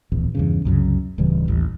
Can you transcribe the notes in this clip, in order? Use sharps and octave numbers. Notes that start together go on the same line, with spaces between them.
D1 A#1 E2
E2 G2 C#3
C2 F#2 C#3 F#3
D1 C#3 E3 G3
A1 D#2